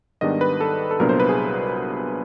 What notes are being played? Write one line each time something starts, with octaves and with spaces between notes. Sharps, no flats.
G#2 D#3 G3 B3 D4 D#5
B4
A4
A4
C2 A#2 F#3 B3 D4 A#4
C5
B4
G#4